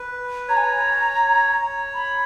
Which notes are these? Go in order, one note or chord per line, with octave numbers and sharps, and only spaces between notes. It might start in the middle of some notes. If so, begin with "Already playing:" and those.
Already playing: B4
C#5 A#5
G#5
A#5
B5